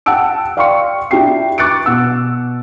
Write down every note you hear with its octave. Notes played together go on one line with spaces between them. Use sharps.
F#5 G5 A5 E6 D7
D5 F5 G5 C6 C#6 C#7
D4 E4 F#4 G5 C7
C#6 D6 F#6 A6 C#7 D7
B2 F#5 E6